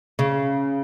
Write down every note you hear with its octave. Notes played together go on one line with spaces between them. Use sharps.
C#3